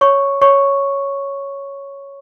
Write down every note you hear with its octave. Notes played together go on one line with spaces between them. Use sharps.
C#5 C#6
C#5 C#6